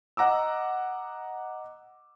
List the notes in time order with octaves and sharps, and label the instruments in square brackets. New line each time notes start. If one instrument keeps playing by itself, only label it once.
[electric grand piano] D#5 F#5 A#5 D6 E6